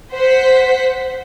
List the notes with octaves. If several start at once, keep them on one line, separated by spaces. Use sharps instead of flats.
C5 F#5 B6